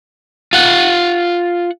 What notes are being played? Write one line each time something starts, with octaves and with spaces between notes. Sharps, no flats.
F4 F#5